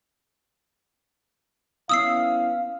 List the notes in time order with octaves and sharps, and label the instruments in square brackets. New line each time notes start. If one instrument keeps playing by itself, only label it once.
[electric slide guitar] B3 C#4 E4 [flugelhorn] F5 [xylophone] D#6 E6 C7